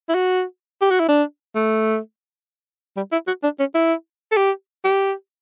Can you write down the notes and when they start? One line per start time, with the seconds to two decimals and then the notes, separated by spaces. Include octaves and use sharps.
0.09 E4
0.15 F#4
0.81 G4
0.91 F#4
1.00 E4
1.08 D4
1.55 A3
2.97 G3
3.12 E4
3.27 F#4
3.43 D4
3.59 C#4
3.75 E4
4.32 A4
4.37 G4
4.84 G4